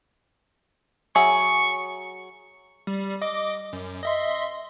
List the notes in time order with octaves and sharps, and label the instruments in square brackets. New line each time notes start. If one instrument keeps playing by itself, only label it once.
[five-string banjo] F#3 G#4 E5 [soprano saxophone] C#6
[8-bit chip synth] G3
D#5 D6
F#2
D#5 E5 C6